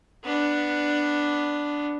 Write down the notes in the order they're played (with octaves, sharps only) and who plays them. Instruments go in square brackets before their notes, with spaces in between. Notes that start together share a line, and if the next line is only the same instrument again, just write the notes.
[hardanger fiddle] B3 D4